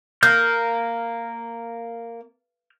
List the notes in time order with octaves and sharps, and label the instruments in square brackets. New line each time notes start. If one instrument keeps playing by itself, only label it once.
[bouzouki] A#3 [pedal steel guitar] F6 G6